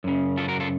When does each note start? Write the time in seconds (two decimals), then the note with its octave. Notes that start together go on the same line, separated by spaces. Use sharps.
0.04 F#2 C#3
0.37 F4 A4
0.48 F#4 A#4
0.60 F4 A4